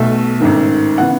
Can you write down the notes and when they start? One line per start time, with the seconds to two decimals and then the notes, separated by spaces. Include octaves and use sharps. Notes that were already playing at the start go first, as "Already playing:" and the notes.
Already playing: B1 B2 A3 E5
0.40 A1 G#2 D#3
0.98 C#3 E3 B3 F#5